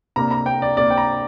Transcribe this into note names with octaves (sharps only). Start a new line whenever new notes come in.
C3 A#3 D4 A#5
A#5
G5
D5
C3 A#3 D4 D5
G5
A#5